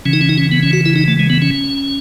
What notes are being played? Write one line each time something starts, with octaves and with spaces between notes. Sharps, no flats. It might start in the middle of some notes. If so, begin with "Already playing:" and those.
C#3 E3 C#4
D#4
C#4
D#4
C#4
B3
C#4
F#4
E4
D#4
A3
G#3
B3
C#4